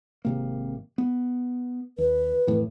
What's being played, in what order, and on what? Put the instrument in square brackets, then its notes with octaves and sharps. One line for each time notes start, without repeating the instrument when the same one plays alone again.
[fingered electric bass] G#1 C3 A#3
B3
[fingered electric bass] D#2 [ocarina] B4
[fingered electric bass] F2 A2 E3